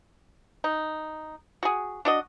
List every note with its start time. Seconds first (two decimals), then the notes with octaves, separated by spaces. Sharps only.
0.64 D#4
1.63 F#4 G#4
2.05 D4 F#4 D#5